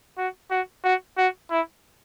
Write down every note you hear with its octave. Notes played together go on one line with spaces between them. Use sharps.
F#4
F#4
F#4
F#4
E4